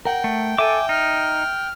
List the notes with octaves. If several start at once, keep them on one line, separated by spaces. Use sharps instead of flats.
A#4 F#5 G5
A3
A4 E5 G#5 D6
D#4 F6